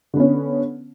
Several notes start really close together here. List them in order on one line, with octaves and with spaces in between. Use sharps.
D3 B3 C#4